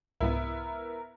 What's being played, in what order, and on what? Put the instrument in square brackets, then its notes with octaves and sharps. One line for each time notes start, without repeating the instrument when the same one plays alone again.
[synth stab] C2 G#2 [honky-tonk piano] B3 E4 [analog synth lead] A#4